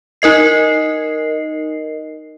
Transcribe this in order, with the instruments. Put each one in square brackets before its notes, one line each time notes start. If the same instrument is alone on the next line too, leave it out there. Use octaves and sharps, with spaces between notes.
[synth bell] D#4 A#4 D#5 C7